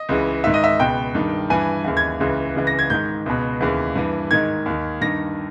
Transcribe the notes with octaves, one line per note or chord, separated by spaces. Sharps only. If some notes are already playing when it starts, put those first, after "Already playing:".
Already playing: D#5
C#2 C#3 E3
G#2 D#3 E5
D#5
E5
C#2 B2 G5
G2 D#3
G2 E3 G#5
D#2 C#3 E3
G#6
C#2 C#3 E3
C#2 C#3 E3
A#6
G#6
G#2 D#3 G6
C#2 B2
D#2 C#3 E3
G2 E3
G#2 D#3 G#6
D#2 D#3
G2 D#3 A#6